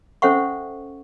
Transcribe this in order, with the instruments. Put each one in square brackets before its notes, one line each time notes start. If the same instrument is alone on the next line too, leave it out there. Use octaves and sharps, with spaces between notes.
[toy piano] C#4 A4 C5 E5 F#5 C#6